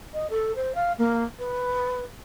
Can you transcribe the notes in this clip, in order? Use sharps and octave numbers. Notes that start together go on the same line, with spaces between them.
D#5
A4
C5
F5
A#3
B4